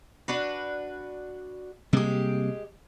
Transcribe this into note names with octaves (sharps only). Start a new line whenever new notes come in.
D4 F#4 B4
C3 G3 G#3 A#3 G4